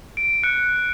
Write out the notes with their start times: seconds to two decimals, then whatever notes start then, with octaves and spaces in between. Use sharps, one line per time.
0.17 D7
0.43 F#6 C#7